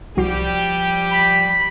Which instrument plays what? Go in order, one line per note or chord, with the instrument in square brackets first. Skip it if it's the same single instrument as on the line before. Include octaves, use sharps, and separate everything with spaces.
[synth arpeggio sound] C2 F#4 C7 [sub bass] F3 [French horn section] G3 G4
[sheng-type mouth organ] B5